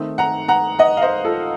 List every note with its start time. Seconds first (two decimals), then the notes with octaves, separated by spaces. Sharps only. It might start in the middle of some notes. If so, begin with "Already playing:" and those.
Already playing: D#3 A3 C4 D#4
0.18 F#5 A#5
0.48 F#5 A#5
0.79 D#5 F#5
0.97 F5
1.02 C5 D#5
1.25 F4 A4